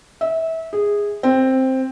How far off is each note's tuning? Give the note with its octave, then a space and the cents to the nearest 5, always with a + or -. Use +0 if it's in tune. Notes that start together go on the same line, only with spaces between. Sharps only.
E5 -25
G#4 -15
C4 +5